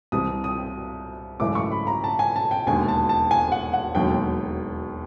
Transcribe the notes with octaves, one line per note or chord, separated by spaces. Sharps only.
C2 C3 E3 D#6
D#6
G#1 F#2 C#3 E3 A3 D6
C#6
B5
A#5
A5
G#5
A5
G5
E1 D#2 D3 G#5
A5
A5
G#5
F#5
F#5
E1 D#2 D3 F#3 G5